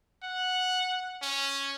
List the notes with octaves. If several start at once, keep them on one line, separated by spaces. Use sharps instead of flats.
F#5
C#4